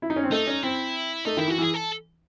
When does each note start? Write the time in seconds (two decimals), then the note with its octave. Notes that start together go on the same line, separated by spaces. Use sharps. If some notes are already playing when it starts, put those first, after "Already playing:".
0.02 E4
0.10 D#4
0.16 C#4
0.24 C4
0.31 A3 D#4
0.47 C#4
0.63 C4 E4
1.25 A3 D#4
1.37 D#3 E4
1.47 E3 F#4
1.58 E3 G#4
1.74 A4